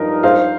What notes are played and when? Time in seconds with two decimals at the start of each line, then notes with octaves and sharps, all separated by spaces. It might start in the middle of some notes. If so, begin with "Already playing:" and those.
Already playing: G2 F3 D#4 A#4
0.23 C5 F5